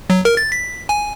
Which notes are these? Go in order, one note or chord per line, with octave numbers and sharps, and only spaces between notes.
F#3
A#4
A6
B6
G#5